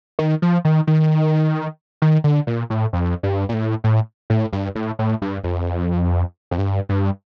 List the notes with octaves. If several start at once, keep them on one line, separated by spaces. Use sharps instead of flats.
D#3
F3
D#3
D#3
D#3
D3
A#2
A2
F2
G2
A#2
A2
A2
A2
G2
A2
A2
G2
F2
F2
G2
G2